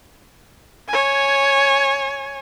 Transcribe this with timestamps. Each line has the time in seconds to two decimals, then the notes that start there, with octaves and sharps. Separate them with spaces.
0.88 C#5 G#5